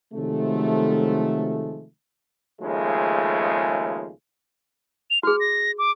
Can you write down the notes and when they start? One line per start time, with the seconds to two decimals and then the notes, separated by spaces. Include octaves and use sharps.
0.14 C3 D#3 F3 F#3 G#3 A3
2.62 D#2 C#3 F3 G#3 A3
5.10 F7
5.23 F#4 G#4 F6
5.40 A#6
5.79 D6